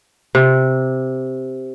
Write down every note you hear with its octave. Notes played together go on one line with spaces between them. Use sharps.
C3